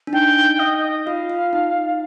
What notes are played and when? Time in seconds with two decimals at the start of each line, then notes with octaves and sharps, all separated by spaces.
0.07 D4
0.13 D#4 G5
0.59 D#5
0.83 D#5
1.06 F4 F5
1.30 F4
1.53 D#4